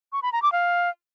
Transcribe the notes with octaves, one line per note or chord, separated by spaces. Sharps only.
C#6
B5
A#5
D6
F5